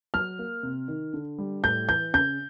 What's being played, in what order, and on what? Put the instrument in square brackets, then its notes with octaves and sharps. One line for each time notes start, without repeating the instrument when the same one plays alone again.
[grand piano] F#3 [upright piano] F6
[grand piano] A#3
C3
D#3
D3
G3
[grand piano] A2 [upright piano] G6
[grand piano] E3 [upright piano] G6
[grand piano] C#3 [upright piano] G6